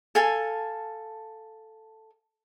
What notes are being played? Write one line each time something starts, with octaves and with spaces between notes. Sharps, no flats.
A4 F5 G#5 A5